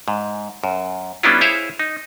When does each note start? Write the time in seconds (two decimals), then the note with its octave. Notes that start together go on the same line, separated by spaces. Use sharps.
0.08 G#2
0.64 F#2
1.23 G3 B3 C#4 D4 E4 F4
1.41 E4 G#4 C5 C#5 E5 F5
1.79 D#4